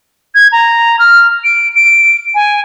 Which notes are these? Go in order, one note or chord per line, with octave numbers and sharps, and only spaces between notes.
G#6
A#5
F6
D7
D7
G#5